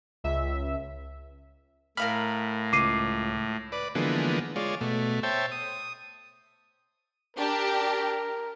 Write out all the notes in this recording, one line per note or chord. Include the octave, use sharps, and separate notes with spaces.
C#2 E5
A2 A#4 F5 B5 F6
C#2 D6 C7 D#7
B4 D5
D3 E3 F3 G#3 A#3 B3
G#3 F4 C#5 D5
B2 A3
C5 C#5 E5 G5 A5
D#6
D4 G4 A#4